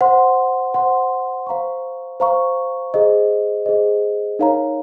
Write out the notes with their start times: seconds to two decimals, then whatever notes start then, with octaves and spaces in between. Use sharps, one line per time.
0.01 C5 F#5 C6
0.74 C5 F#5 C6
1.47 C5 F5 A#5 C#6
2.20 C5 F5 A#5 C#6
2.94 G#4 C5 D#5
3.66 G#4 C5 D#5
4.39 D#4 A#4 C#5 F5 A#5